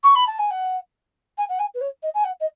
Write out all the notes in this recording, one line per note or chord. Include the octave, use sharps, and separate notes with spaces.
C#6
B5
A5
G#5
F#5
G#5
F#5
G#5
B4
C#5
D#5
G#5
F#5
D#5